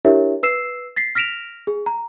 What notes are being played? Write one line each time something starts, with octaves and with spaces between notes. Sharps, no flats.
D4 E4 G4 A#4 C#5 E5
B4 E6 C7 E7
A6 B6 C7
F6 A#6 B6 D7 E7 F7
G#4
A#5